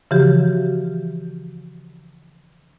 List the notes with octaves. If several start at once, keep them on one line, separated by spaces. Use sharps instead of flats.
C#3 E3 F3 F#4 G4